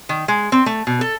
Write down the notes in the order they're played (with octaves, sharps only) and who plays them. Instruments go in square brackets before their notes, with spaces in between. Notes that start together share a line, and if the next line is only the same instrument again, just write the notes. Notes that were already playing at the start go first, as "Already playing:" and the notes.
[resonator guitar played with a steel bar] D#3
G#3
C4
A3
B2
A4